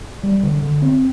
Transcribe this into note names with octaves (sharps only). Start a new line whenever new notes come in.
G3
D3
D3
C4